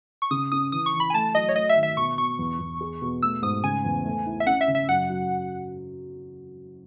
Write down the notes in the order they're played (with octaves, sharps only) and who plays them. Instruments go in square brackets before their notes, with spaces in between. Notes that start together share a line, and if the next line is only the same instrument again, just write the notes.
[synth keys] C#6
[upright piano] C#3 [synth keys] D#6
[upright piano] C#4 [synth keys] D#6
[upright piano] E3 [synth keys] D#6
[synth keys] C#6
[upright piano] E3
[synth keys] B5
G#5
[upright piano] A3 [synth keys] A5
[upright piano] F#3 [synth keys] D#5
[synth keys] C#5
[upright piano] A3 [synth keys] D#5
[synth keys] E5
[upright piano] D#3
[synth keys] E5
[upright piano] B2 [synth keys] C#6
[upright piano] B2 [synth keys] C#6
[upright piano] E2
E2
G#4
B2
[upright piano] A3 [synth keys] E6
[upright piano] G#2 [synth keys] D#6
[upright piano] C#3 [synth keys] G#5
[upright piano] E2
A3
E4
[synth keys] E5
[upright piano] C#4 [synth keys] F#5
[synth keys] E5
[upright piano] C#3
[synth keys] E5
[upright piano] F#2 [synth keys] F#5
[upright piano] F#3